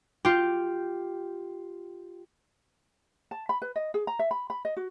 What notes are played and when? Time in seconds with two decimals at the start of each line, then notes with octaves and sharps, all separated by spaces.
0.25 F4 G4
3.31 A5
3.49 B5
3.62 B4
3.76 D#5
3.94 G#4
4.07 A#5
4.19 E5
4.31 B5
4.50 B5
4.65 D#5
4.77 F#4